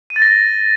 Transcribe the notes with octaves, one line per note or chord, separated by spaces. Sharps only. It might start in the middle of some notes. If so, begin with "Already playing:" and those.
D#7
A6
A#6